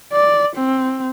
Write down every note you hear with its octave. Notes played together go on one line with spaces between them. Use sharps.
D5
C4